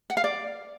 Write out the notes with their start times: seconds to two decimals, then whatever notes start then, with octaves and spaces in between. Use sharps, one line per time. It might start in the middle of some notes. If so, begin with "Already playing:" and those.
0.10 F#5
0.17 F5
0.24 D5